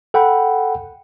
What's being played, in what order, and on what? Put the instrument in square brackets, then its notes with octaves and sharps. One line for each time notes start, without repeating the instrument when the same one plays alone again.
[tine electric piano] A4 F#5 G5 B5